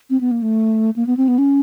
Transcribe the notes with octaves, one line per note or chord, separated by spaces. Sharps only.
C4
B3
A#3
A3
A#3
B3
C4
B3
C#4